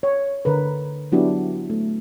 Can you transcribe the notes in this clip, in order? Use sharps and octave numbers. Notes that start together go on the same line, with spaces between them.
C#5
D3 A#4 B4
F#3 B3 D4 E4 F#4 G4
A3